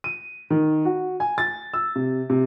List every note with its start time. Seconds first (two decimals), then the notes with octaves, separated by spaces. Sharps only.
0.04 D#7
0.50 D#3
0.85 F#4
1.20 G#5
1.38 A6
1.74 E6
1.96 C3
2.30 C3